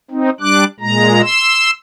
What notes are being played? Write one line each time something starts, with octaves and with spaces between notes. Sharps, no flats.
C4 D#4
G3 D4 D6 F#6
A#2 G#3 A#5
C6 E6